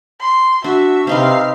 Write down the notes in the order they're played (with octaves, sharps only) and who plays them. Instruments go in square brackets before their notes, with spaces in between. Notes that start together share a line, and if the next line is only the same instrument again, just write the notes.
[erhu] C6
[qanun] D4 [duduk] F#4 [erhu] E5
[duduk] C3 [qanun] C4 D#4 B4 [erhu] F5